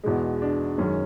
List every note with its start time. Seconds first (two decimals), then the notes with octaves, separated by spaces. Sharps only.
0.04 E2 B2 G#3
0.42 D4
0.78 F#2 D#3 G#3 C#4